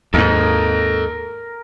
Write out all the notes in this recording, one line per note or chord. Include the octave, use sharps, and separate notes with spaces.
D#2 G#2 A4 A#4 D#5